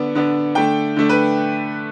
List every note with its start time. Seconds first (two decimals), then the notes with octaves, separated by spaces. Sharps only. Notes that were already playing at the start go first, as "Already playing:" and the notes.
Already playing: D3 B3 D4
0.15 D3 B3 D4
0.55 D3 A3 D4 G5
0.96 D3 A3 D4
1.09 B4